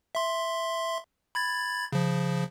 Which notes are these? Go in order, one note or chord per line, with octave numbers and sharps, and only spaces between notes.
E5 C6
B5 G#6 A6
C#3 F3